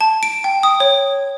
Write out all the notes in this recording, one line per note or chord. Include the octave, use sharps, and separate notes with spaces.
A5
D7
G5
D#6
C#5